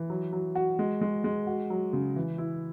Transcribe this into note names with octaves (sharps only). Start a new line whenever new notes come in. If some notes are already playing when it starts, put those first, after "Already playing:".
Already playing: E3
F#3
F#3
F#4
G#3
G#3
G#3
F#4
F#3
C#3
E3
E4